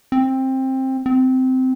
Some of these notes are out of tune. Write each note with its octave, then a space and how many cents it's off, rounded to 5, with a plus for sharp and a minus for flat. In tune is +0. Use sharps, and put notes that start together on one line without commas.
C4 +15
C4 -15